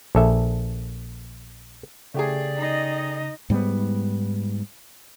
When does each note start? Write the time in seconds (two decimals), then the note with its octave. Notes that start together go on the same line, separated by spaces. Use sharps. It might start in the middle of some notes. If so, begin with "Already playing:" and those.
0.15 A#1 A4 E5
2.14 C#3 A3 G4 G#4 D5
2.57 D#4 D#5
3.50 G#2 G3 A#3 B3